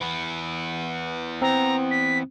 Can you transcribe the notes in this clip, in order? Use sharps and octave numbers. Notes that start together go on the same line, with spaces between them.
E3 B3
C4 A#5
B6